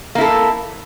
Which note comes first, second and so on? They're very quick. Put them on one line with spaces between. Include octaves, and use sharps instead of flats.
A#3 E4 A4